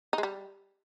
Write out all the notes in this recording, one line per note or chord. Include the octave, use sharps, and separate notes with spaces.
D#4
G#3
G3